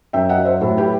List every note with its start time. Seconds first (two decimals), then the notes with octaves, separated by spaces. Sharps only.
0.13 F#2 E5 G5
0.29 D#5 F#5
0.38 F#3
0.45 C5 E5
0.61 A2 F#4 A4
0.77 G4 B4